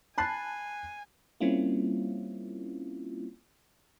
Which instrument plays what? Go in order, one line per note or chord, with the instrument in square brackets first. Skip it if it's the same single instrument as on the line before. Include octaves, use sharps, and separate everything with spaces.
[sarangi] G#5 [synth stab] A5 [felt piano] B5 F#6 C7
[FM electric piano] G3 A#3 C4 C#4 E4 F4